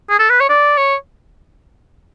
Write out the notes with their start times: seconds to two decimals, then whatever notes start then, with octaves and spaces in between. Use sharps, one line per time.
0.10 G#4
0.19 A4
0.30 B4
0.40 C#5
0.50 D5
0.78 C#5